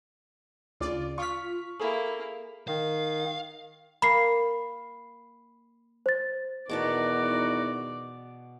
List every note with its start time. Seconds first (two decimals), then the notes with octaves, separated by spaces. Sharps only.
0.80 D2 C#3 F4 D5
1.18 F4 C#6 F6 B6
1.80 A#3 E4 G#4 A4
2.68 D#3 F5
4.02 A#3 B5 C7
6.06 C5 A6
6.69 E2 B2 D#3 D#4 F#4 D5 A5 D6